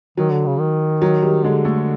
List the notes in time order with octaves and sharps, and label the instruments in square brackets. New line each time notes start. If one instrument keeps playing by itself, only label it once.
[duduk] D#3 [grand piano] F#3
[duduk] D3
C#3
D#3
[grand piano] F#3
G3
[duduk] D3 [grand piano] G#3
[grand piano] A3